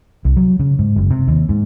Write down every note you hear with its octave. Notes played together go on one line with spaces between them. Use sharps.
C2
F#3
C#3
G#2
F#1
C3
D#2
G#2